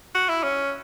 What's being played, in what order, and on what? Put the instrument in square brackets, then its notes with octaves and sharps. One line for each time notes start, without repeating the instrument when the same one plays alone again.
[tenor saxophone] F#4
E4
C#4